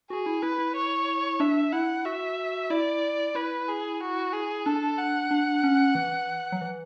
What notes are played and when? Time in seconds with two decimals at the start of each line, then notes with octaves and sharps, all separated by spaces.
0.10 F#4 G#4
0.26 E4
0.42 E4 B4
0.58 E4
0.76 C#5
1.40 D4 E5
1.72 E4 F#5
2.05 F#4 E5
2.70 E4 D5
3.35 E4 B4
3.69 G#4
4.00 F#4
4.33 G#4
4.66 D4 A4
4.98 F#5
5.31 D4
5.63 C#4
5.95 E3
6.52 F#3
6.61 E3